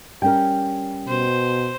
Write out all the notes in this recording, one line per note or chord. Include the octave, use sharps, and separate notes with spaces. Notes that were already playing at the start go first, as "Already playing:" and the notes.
G3 C#4 A#4 G5
B2 C5